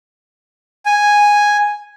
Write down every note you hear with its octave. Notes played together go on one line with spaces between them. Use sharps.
G#5